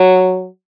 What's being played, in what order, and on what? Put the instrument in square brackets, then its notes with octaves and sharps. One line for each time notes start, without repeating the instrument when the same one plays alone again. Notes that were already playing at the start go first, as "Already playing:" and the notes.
Already playing: [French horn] F#3